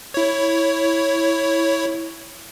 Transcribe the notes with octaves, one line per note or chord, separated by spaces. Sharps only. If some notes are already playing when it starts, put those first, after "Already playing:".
E4 C#5